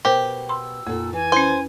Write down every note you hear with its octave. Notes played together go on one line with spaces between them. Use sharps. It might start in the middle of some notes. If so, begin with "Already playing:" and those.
B2 G4 A#4 C5 G5
B5 C6 E6
F2 A#2 A4
E3 G#5
C#4 E4 C5